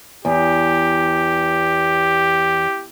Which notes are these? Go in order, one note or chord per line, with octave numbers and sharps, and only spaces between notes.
E2 G4